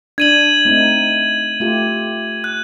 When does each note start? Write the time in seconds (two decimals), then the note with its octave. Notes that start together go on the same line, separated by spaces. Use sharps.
0.18 D4 G#6 D#7 F#7
0.65 A3 C4 D#4
1.60 A3 F4 G4
2.44 F#6